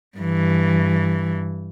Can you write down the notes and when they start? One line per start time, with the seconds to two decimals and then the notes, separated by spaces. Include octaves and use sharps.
0.18 G2 E3